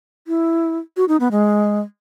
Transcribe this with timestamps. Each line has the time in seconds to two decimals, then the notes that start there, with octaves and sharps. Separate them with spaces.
0.27 E4
0.97 F#4
1.09 D#4
1.20 B3
1.31 G#3